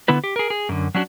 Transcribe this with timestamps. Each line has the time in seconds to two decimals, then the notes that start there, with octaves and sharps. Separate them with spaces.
0.08 D3 B3 E4 B4
0.24 G4
0.36 G#4 A#4
0.50 G#4
0.69 F#2 D3
0.95 F#3 C#4 D4 F#4